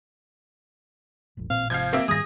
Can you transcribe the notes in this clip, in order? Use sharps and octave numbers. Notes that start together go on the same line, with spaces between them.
F1 A#1 F2
A1 A#2 C4 F5
G#1 C3 F3 F5 G6 G#6
A#3 C4 E5
G#2 D#3 G3 G#4 D#6 A#6